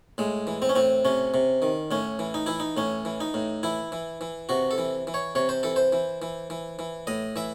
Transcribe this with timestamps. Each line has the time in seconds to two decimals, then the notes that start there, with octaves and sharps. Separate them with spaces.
0.18 A2 G#3
0.47 E3
0.62 C4
0.69 C#4
0.75 A2 C4
1.05 C3 C#4
1.34 C3
1.62 D#3
1.91 A2 C#4
2.19 E3
2.34 D#4
2.46 E3 E4
2.60 D#4
2.77 A2 C#4
3.05 E3
3.21 D#4
3.34 A2
3.63 E3 E4
3.92 E3
4.21 E3
4.49 C3 F#4
4.71 A4
4.78 E3
5.07 E3
5.14 C#5
5.35 C3 C#5
5.49 C5
5.63 E3 A4
5.76 C5
5.93 E3
6.22 E3
6.50 E3
6.79 E3
7.07 A2 D#5
7.36 E3 E5